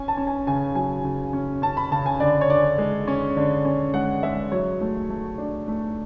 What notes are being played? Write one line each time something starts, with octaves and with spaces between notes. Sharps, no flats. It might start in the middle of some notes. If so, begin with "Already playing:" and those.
Already playing: C#4 G#5
A5
C#4
G#5
C#3 G#5
F#3 G#5
C#3
C#4
C#4 A5
B5
C#3 A5
G#5
D3 D5
C#5
D3 D5
G#3
C#4
D3
C#4
G#3 F#5
G#3 E5
F#3 C#5
A3
A3
D4
A3